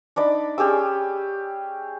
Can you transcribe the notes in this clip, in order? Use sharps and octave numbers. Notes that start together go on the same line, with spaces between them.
D4 D#4 D5 B5
C#4 G4 G#4 E6